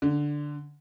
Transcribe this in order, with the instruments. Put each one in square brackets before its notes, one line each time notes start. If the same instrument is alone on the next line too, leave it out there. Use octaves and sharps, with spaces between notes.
[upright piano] D3